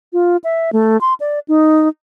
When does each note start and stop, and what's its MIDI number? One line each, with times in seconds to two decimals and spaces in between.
0.13 0.37 65
0.44 0.70 76
0.73 0.99 57
1.01 1.14 84
1.20 1.39 74
1.48 1.88 63